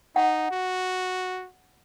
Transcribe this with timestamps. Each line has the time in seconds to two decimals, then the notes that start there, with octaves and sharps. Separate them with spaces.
0.16 D#4 F#5
0.51 F#4